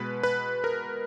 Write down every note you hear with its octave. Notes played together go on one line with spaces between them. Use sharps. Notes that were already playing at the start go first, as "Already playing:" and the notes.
Already playing: B2 G#3 B4
B4
A#4